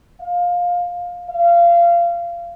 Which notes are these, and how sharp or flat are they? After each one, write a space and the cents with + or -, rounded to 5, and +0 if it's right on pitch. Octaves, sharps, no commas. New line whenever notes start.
F5 +15
F5 -25